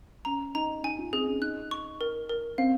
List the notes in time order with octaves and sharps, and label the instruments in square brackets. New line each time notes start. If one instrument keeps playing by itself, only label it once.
[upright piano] C#4 [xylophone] A#5
[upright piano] D#4 [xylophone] A#5
[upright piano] D#4 [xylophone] G#5
[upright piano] F4
[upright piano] C4 [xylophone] G#4
[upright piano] C#4
[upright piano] D#4 [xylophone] F#6
[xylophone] C#6
A#4
A#4
[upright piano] C4 [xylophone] F5